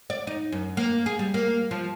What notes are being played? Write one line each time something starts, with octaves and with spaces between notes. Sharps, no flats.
D5
D#4
F#2
A#3
G#4
G3
A#3
F3